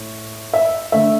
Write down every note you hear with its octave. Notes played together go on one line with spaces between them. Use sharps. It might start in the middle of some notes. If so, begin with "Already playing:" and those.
Already playing: A2
E5
D3 A3 E5